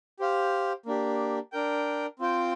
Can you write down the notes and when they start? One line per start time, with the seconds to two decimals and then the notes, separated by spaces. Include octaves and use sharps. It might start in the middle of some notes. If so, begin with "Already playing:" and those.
0.19 G4 C5 F5
0.86 A#3 D4 G4
1.52 D4 A#4 G5
2.19 C4 F4 C5 G5